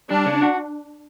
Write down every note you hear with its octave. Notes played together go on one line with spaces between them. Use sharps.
G3 D4
C#3
F#4